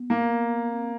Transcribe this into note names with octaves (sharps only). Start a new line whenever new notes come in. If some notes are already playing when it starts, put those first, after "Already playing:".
Already playing: B3
A#3
C4